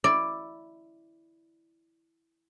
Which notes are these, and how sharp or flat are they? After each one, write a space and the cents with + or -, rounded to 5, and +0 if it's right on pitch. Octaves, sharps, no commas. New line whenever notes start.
E4 +0 D5 +5